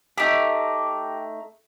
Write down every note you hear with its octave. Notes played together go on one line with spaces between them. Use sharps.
A3 D#4 G4